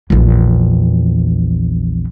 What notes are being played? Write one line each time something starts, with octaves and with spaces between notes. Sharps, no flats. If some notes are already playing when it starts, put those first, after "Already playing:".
A#1 E2